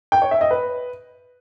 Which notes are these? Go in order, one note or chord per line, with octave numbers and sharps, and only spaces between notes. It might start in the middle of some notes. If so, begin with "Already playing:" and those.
G5
C#5
E5
D#5
B4